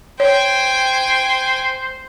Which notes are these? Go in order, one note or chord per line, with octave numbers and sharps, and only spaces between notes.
C5 C#5 G5 G#5